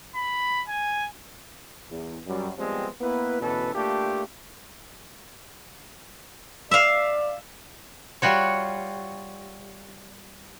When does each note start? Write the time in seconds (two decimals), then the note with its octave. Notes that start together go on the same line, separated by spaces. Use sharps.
0.15 B5
0.68 G#5
1.91 E2
2.27 F#2 G3
2.58 F3 G3 G#3 B3 C4
3.01 A#3 B3 E4 B4
3.41 D2 B2 E3 C#4 A4 B4
3.74 A3 A#3 D4 F4 G4
6.71 D5 E5 F5
8.22 G3 F4 F#4 C#5